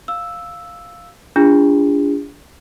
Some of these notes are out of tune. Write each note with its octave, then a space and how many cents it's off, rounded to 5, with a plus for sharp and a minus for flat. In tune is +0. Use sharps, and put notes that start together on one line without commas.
F5 +0 E6 +0
D4 -30 F4 -40 G#4 -40